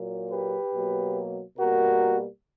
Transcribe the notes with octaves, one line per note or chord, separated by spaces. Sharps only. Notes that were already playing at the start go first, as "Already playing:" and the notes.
Already playing: A#2 F#3 A#3
G4 B4
B2 F#3 A#3
B2 G3 A#3 F#4 A#4